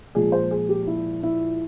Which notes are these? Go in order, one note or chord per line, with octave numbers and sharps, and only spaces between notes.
A#2 F3 G#3 G#4
C5
G#4
G4
E4
E4